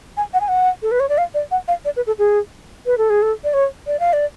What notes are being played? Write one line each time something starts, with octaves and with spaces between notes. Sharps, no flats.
G#5
F#5
G#5
F#5
A4
B4
C#5
D5
F5
D5
F#5
F5
D5
B4
A4
G#4
B4
A4
G#4
A4
D5
C#5
D5
F5
D5